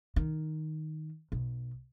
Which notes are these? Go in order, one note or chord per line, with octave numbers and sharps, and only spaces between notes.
D#3
B1